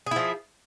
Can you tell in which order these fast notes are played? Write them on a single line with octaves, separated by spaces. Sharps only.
G#4 E4 F3